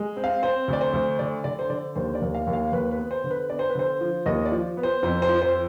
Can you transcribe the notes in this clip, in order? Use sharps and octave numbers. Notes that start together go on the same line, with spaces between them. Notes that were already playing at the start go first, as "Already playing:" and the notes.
Already playing: G#3
C4
F5
C4 C5
D2
D5
C5
D2
D3 D5
D3 D5
C5
D3 D5
D#2 C5
D5
D#2
F5
D#2
F5
D#2 B4
B4
B3
C5
D3
B4
B3 D5
C5
B4
D3 C5
F3
D#2 D#5
D5
F3
B3
C5
F2 C5
C5
F3
C5